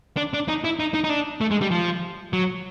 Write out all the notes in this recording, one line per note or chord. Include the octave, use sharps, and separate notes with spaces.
D4
D4
D#4
E4
D#4
D#4
D#4
D4
A3
G#3
G3
F3
F#3